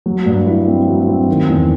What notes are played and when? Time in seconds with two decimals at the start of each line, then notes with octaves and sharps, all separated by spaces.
0.06 F#3
0.26 G2
0.46 E4
0.67 C4
0.88 F#3
1.07 C4
1.28 D#3
1.49 E2